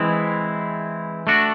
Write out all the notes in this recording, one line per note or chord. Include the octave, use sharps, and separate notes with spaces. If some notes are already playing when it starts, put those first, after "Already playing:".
Already playing: E3 G#3 C4 E4
A3 D4 F#4